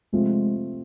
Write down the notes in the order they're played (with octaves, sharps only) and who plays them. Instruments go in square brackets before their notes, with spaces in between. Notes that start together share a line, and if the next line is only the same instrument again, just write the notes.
[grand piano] C3 F3 A3 C4 F4 [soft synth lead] G#3